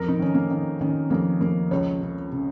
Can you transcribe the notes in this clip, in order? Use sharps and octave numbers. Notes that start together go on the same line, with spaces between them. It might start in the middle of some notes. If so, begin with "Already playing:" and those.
Already playing: F2 A#4
D#4
D#3 C#4
A#3
D#3
D#3 C#4
F2 A#3
F2 A#3
C#2 C#5
C#3
C#3